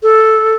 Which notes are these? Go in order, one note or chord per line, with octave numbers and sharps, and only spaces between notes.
A4